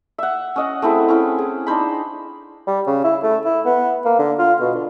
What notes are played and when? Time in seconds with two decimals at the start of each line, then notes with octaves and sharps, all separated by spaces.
0.18 E5 F#5
0.56 C#4 D#5 F#5
0.82 A3 C4 E4 G#4
1.08 C4 C#4 E4
1.38 G#4
1.67 D4 D#4 C5 B5
2.67 G3
2.87 C#3
3.04 E4
3.23 A3
3.45 E4
3.65 B3
4.05 A#3
4.19 D3
4.39 F4
4.60 B2
4.75 D3